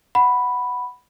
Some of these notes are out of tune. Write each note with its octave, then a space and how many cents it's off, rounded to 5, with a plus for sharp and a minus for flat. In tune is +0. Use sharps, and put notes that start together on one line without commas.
F#5 +0 B5 +0